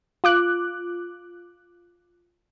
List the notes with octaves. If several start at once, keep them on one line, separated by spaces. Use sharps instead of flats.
F4 D6 F#6